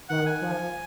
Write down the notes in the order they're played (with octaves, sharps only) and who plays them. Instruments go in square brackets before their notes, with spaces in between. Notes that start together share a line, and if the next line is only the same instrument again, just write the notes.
[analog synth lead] D#3 [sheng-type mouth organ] F#5
[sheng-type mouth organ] G#5
[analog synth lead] F3